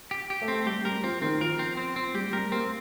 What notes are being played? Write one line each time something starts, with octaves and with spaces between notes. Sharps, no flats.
G4
G4
A3
C4
G3 G4
G3 A#4
F3 C4
D#3 C4
F3 A#4
C4
C4
C4
G3 G4
G3 A#4
A#3 C4